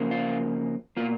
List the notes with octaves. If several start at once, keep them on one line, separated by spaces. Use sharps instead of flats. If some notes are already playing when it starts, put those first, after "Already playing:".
Already playing: C#3 F3 A#3
F4
B2 A#3 F4